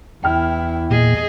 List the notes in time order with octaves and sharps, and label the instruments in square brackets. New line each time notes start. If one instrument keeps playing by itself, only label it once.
[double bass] E2 [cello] E4 [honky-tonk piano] G5 F6
[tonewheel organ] A#2 [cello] G#4 D#5